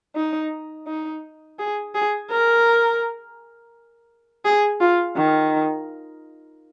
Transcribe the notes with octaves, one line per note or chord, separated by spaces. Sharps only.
D#4
D#4
G#4
G#4
A#4
G#4
F4
D#3